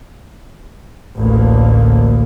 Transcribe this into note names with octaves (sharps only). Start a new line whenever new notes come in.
A1 D2 A#3